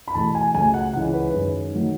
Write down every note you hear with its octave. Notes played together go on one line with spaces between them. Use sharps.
B5
E2 B2 A3 A5
G#5
C#2 C#3 F#3 A3 G#5
F#5
C#2 C#3 E3 F#5
B4
F#2 D#3 G#3
D#3 F#3 A3